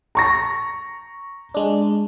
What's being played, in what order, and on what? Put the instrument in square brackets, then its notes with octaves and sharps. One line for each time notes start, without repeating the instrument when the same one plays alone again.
[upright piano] A#5 C#6 A#6
[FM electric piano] G#3 D4